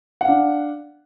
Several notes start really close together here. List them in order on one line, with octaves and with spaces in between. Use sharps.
F#5 F5 D4